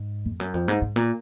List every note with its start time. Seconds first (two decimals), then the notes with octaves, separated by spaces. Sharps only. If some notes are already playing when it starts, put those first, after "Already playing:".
Already playing: G#2
0.25 F2
0.40 F#2
0.54 F2
0.68 G#2
0.82 G#2
0.96 A#2